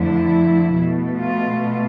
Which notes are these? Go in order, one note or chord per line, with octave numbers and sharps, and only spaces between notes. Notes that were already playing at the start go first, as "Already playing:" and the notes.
Already playing: F2 D3 F3 A3 E4
B2 A3
F4